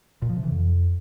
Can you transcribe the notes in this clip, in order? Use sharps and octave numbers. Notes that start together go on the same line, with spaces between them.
A#2
F3
C3
E3
F2